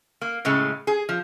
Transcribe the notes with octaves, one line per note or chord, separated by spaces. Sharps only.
A#3
A2 C#3 G#3 A3
G#4
F3